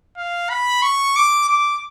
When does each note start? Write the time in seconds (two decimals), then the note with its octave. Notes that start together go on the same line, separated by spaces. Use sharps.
0.17 F5
0.50 B5
0.82 C#6
1.16 D6
1.48 D6